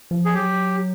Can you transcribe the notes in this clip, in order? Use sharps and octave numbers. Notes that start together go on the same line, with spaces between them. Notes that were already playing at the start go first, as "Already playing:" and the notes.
F3
G#4
F#3 G4